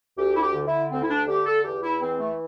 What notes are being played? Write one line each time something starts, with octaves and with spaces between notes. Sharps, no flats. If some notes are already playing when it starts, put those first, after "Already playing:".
D2 G4
E4
G4
D3
E4
D2 C4
E4
D4
D3 G4
A4
E2 G4
E4
E3 C4
A3